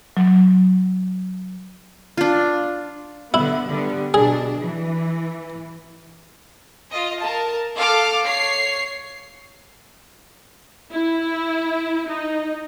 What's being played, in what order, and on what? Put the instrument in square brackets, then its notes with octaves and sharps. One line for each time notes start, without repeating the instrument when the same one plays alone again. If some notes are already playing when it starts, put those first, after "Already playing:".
[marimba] F#3
[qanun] D4 F4
[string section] D3 B3 [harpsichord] E4
[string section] D3 G3 B3
[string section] B2 D4 [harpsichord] G#4
[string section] E3
[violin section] F4 D#5
A#4 A5
A4 F5 A5 D6 F6
C#5 C7
[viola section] E4
D#4